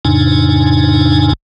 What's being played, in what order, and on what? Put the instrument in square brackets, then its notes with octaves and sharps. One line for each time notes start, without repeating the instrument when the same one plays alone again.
[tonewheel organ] F2 A2 C#3 D4 D#4 G#5